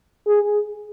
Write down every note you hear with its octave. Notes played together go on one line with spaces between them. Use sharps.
G#4